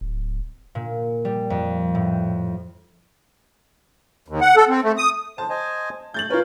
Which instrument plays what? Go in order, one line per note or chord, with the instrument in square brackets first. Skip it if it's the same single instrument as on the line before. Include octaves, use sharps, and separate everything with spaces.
[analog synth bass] D1
[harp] A#2
G3
F2
A2
[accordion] D#2
F#5
A4
C4
A3
D#6
[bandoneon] C5 [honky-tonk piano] A5
[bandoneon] C5 D#5 G#5
[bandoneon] A3 [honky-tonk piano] G6 A6 F#7
[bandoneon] C#4 A#4 C#5 [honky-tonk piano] F4 B4